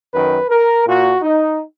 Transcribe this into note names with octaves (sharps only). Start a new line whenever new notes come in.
F#2 D#3 B4
A#4
A#2 F#4
D#4